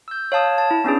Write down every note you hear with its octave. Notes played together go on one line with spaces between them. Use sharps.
E6 G6
C#5 F5 A5 D#6
A5
E4
B3 C#4 D4 G#4